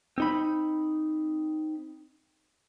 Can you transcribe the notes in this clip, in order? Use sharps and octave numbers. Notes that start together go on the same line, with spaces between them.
C4 D#4 B5